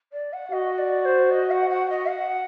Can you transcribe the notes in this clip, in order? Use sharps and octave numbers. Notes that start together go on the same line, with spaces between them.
D5
F#5
F#4 D#5
D5
C5
D#5
F#5
F#5
D#5
F#5